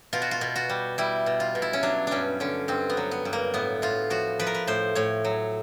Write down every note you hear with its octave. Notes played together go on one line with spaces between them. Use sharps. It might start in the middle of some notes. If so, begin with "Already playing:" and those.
B2 F4
F#4
F4
B2
F#4
G3
G3 E4
B2
F4
B2
E4
C#4
F#3 D4
G2 C#4 D4
D3 C#4
G2 C4
B3
F#3
B3
G2
A#3
A2 B3
A2 F4
F3 F#4
F3 B4
A#4
B4
A2 C5
A2 C#5
F#3